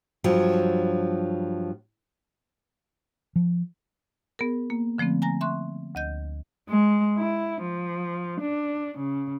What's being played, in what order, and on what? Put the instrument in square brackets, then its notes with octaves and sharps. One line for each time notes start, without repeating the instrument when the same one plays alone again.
[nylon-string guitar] G2 F3 F#3
[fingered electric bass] F3
[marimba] B3 G#4 A#4
A#3
D3 F3 A3 B3 C4
G#5 A#5 A#6
E5 C6 C#6 F#6
D2 D#5 G6
[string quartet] G#3
E4
F3
D4
C#3